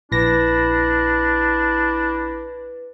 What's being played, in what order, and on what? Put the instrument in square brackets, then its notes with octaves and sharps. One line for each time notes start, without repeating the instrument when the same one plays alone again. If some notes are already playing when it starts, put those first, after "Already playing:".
[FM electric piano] A#1 A#6 [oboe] D4 [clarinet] E4 [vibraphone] B4